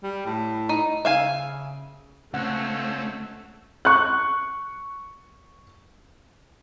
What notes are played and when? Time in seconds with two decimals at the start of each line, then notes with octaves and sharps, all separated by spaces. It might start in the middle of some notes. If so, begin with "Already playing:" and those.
0.03 G3
0.25 A2
0.69 D#4
1.05 C#3 E5 F5 G#5
2.34 C#2 A3 C4 C#4 F#5 E6
3.85 C#6 F#6